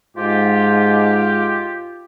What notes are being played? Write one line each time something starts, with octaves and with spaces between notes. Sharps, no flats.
G#2 F4 G4